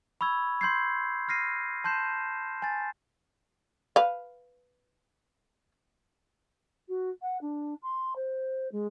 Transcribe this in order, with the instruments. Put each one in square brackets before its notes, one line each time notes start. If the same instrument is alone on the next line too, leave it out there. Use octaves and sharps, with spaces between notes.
[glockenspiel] B5 C#6 E6 G#6
C6 G6 G#6 C7
C6 F6 A#6 C7 D#7
A5 C6 G6 C7 E7
G#5 A6
[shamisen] B4 F5
[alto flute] F#4
F#5
D4
C6
C5
G#3